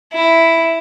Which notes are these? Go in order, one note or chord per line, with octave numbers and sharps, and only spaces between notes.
E4